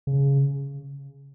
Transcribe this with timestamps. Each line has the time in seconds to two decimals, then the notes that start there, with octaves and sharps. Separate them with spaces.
0.07 C#3